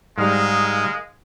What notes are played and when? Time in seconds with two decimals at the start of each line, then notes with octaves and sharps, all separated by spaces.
0.18 G#2 G3 G#3 A#4 F5 D#6 F6